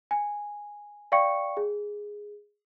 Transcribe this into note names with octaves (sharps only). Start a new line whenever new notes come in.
G#5
D5 F5 G5 C#6 C#7
G#4